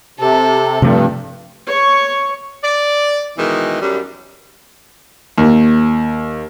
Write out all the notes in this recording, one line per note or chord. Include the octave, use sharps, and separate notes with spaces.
C3 A4
G2 C3 F3 A3
C#5 C#6
D5
B2 D#3 E3 G#3
F#2 G3
D#2